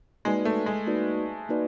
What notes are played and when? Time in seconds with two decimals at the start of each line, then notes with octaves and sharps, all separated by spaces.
0.25 G#3 A#3 D#4 F#4 B4 D5
0.45 A3
0.66 G#3
0.87 A#3 D#4 F#4 B4 D5
1.49 A#3 D#4 F#4 B4 D5